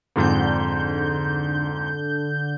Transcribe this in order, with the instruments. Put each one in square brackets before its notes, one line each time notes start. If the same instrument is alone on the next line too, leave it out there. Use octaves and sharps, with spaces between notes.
[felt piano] F2 G#2 [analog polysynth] D3 G6